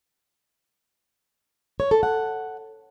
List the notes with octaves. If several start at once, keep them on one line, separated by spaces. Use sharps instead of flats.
C#5
A4
F#5